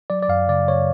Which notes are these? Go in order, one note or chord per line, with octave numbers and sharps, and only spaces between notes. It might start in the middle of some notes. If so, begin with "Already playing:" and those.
F#3 D5
D5
F#2 F5
C#3 D5
C#3 C#5